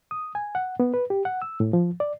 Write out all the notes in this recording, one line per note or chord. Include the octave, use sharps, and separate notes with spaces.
D#6
G#5
F#5
B3
B4
G4
F#5
E6
A2
F3
D5